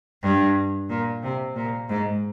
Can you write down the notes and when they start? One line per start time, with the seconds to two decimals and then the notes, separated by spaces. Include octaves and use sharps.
0.22 G2
0.89 A#2
1.23 C3
1.55 A#2
1.89 G#2